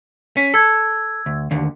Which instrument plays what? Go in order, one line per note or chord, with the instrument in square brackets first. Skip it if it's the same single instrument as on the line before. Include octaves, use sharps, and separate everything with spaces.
[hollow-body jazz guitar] C#4 [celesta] B6
[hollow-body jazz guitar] A4 [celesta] E6 G#6
[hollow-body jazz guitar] D2
D#2 D3